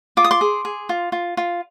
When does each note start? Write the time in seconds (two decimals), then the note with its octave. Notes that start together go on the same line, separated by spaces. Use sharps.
0.17 F4 D6
0.24 D#6
0.31 C6 D6
0.41 G#4
0.65 G#4
0.89 F4
1.12 F4
1.37 F4